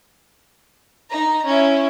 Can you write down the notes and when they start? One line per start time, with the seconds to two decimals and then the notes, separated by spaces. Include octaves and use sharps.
1.10 D#4 A#5
1.46 C#4 E4